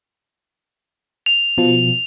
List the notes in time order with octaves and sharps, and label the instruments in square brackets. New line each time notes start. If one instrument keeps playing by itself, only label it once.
[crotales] F7
[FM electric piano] B2 F3